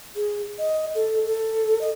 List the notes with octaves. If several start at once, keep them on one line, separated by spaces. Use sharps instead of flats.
G#4
D#5
A4
A4
D#5